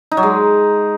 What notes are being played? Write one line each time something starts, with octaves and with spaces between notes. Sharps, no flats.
D#4
F#3
G#3